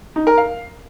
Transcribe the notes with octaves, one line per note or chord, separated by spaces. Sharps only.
D#4
A#4
F5